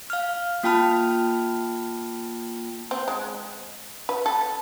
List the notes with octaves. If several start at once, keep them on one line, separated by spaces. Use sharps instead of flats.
F5 F6
A#3 F4 G5 A5 B5 F6
C4
G#3
B4
A4